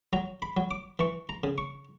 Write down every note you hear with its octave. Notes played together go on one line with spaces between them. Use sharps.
F#3 A#5
B5
F#3
D6
E3 C#6
A#5
C#3
C#6